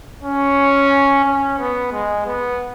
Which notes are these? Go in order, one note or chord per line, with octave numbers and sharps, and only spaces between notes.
C#4
C#4
B3
G#3
B3